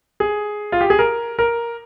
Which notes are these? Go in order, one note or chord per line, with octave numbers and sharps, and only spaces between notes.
G#4
F4
G4
G#4
A#4
A#4